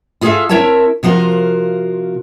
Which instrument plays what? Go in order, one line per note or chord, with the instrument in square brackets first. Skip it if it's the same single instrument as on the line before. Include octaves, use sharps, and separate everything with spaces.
[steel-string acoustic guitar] E4 F4 G#4 A4 E5 F5
C4 E4 A#4 C#5 E5 A5
C3 F3 F4 F#4 A#4